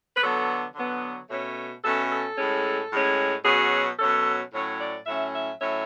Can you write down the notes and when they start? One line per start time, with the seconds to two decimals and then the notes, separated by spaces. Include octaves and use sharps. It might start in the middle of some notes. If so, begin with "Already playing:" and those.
0.15 B4
0.21 D3 F#3 B3 A4
0.75 D3 F#3 B3
1.29 B2 A3 C#4 C#5
1.83 B2 A3 C#4 A4
2.10 A4
2.37 A2 G#3 C#4
2.91 A2 G#3 C#4
3.44 B2 F#3 C#4 G#4
3.99 B2 F#3 C#4 A4
4.52 A2 F#3 C#4 C#5
4.79 D5
5.06 A2 F#3 C#4 E5
5.33 E5
5.60 A2 F#3 C#4 E5